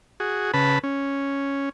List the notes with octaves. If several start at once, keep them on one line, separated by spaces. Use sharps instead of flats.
F#4 G#4
C#3 B4 A5 B5
C#4